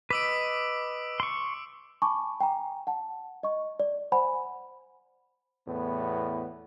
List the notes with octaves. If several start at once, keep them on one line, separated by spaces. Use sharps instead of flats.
B4 D#5 D6 E6 D7
C6 C#6
G#5 A5 B5 C#6 D6
G5 G#5 A#5
F#5 A5
D#5 C#6
D5
C5 F#5 G#5 B5
E2 A2 B3